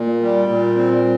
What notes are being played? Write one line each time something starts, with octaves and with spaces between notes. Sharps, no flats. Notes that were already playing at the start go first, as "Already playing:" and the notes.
Already playing: A#2
G3
A#2
C4